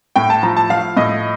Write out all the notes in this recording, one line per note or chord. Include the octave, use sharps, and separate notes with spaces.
A2 G5
A5
F3 A#5
A5
F3 F5
A2 D#5